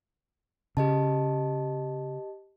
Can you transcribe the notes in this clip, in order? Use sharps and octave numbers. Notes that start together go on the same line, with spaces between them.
C#3 G4 D#5 A5